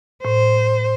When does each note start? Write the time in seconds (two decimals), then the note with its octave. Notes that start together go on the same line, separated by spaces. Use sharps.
0.25 A2 C5